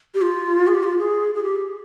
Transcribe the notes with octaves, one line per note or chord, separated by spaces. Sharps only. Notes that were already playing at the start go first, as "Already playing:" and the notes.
G4
F4
G#4
G4
F4
G#4
G#4
G4